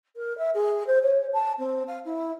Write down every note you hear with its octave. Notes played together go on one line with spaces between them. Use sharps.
A#4
E5
G#4
C5
C#5
A5
C4
F5
E4